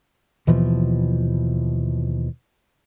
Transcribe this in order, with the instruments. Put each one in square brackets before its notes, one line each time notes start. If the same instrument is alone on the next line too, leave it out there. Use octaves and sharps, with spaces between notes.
[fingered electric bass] D#2 B2 E3 F3